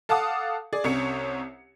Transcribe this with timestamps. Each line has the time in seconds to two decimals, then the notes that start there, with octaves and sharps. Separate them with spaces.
0.09 A4 F5 F#5 A5 D6 D#6
0.73 G#4 D5
0.84 C2 C3 C#4 C#5 C#7